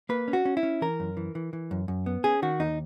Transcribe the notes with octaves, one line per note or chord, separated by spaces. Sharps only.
A#3 B4
C#4
F#4
C#4
E4
C#4
E3 A#4
F#2
E3
E3
E3
F#2
F#2
B3
C#4 G#4
D#3 F#4
D#2 D#4